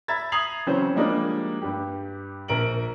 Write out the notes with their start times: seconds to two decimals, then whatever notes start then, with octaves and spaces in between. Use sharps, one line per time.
0.08 E5 A#5 B5 G#6 A6
0.32 A#5 D#6 G#6 C7 F7 F#7
0.66 C#3 E3 F#3 C4 C#4 C5
0.95 F3 G3 G#3 A#3 D4 D#4
1.62 G2 G4
2.48 A#1 A#4 D7 F#7